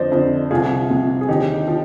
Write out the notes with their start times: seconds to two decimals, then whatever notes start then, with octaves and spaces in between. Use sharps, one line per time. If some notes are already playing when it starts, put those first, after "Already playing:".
Already playing: F2 D3 F3 C5 D5 D#5
0.12 F2 D3 F3
0.50 C2 C3 F3 F4 G#4
0.90 C2 C3 F3
1.21 G#4
1.29 D#2 D3 F3 D#4 G4
1.68 F3